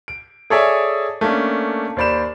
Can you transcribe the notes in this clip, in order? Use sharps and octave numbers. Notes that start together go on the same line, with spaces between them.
D7
G#4 A4 C#5 D5 E5 G#5
A3 A#3 C#4 D4
D#2 C5 D5 B5 E7